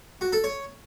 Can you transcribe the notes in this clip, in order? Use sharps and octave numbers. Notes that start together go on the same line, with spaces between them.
F#4
A4
C#5